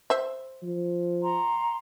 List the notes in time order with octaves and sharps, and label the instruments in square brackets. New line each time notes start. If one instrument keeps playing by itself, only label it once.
[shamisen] C5 E5
[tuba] F3
[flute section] F#5 A#5 C6